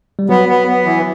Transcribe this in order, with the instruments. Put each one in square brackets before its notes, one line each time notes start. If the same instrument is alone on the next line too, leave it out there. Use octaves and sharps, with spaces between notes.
[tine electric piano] G3
[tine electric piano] F#3 [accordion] B3
[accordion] B3
B3
E3